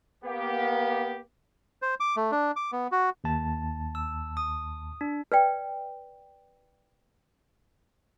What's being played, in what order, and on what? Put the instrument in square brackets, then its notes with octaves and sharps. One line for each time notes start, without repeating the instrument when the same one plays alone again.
[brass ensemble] A#3 B3 G4
[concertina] C5
D6
A3
D4
D6
B3
F#4
[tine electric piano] D#2 A5
[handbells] E6
D#6
D4
[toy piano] B4 D5 G5